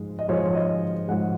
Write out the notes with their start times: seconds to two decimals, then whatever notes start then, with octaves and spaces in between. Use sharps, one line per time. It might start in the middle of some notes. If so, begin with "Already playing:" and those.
Already playing: G#2 F3 G#3
0.19 D#5
0.28 G#2 F3 G#3 C#5
0.45 C#5
0.55 D#5
1.08 G#2 F3 G#3 F#5